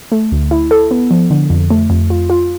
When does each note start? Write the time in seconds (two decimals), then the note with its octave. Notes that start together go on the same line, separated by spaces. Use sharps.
0.12 A3
0.32 D2
0.51 E4
0.71 A4
0.91 B3
1.11 F3
1.30 D3
1.50 F2
1.70 A3
1.90 F2
2.10 F4
2.30 F4